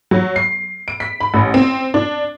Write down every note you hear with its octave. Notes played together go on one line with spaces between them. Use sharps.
F#3
C7
D7
B6
B5
A1
C4
D4